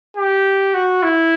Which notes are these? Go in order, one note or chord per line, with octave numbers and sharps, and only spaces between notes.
G4
F#4
E4